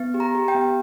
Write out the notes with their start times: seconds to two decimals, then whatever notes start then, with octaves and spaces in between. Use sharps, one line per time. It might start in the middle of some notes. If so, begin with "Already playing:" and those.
Already playing: B3
0.14 G4
0.20 A#5
0.35 G4
0.48 G5
0.55 B3